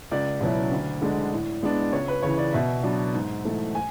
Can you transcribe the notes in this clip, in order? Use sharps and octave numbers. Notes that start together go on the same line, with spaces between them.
C#2 D5
B2 F#3 C#4 E4
D2
D3 G#3 D4
A2
G#3 B3 D4
C#2 C#5
B4
C#3 E3 C#5
D5
B2 E5
F#3 B3 D4
G#2
E3 A3
G#5